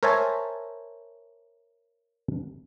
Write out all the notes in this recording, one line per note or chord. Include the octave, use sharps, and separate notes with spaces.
A#4 C5 C#5 E5 G#5 A5